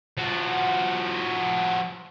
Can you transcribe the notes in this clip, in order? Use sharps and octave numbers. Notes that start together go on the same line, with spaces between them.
F3 F#4